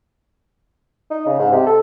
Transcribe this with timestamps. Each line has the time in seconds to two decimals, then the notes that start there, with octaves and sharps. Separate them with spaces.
1.11 D#4
1.26 C#3
1.39 G#2
1.52 C3
1.66 A4